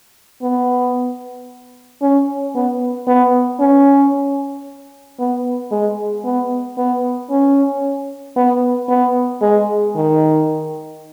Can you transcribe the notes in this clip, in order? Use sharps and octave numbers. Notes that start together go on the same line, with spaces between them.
B3
C#4
B3
B3
C#4
B3
G#3
B3
B3
C#4
B3
B3
G#3
D#3